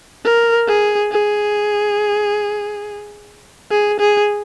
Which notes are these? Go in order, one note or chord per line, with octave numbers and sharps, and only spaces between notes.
A#4
G#4
G#4
G#4
G#4